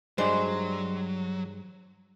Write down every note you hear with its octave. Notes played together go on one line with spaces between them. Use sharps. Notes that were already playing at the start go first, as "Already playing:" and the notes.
G2 F#3 G#3 C5 D5